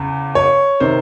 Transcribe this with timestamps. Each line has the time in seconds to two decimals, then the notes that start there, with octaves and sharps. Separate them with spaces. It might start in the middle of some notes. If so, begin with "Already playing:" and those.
Already playing: E2 C#3
0.35 C#5
0.80 C3 D#3 C5